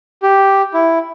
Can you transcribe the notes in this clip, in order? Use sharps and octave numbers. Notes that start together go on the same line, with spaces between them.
G4
E4